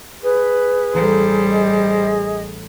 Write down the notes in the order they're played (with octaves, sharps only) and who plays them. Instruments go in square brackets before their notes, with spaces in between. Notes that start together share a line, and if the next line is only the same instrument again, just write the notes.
[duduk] G#4 [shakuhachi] B4
[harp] A1 A#5 [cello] G3 C5
[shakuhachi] D#5